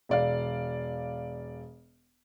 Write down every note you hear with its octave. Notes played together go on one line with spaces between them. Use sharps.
E1 D5 F5